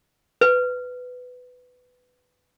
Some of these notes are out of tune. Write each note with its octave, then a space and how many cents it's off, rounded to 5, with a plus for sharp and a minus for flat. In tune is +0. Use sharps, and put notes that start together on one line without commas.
B4 +15